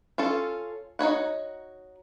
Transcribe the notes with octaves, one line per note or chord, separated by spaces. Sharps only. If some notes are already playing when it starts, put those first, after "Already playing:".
C#4 F4 A4
D#4 F#4 C#5 F#5